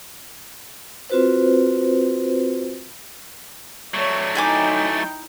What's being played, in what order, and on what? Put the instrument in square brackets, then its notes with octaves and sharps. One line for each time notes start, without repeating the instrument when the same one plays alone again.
[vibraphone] C4 F4 F#4 B4 C5
[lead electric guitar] F#3 A3 [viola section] C#5 D5
[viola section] D#4 E4 G5 [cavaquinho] A4 G#5 D6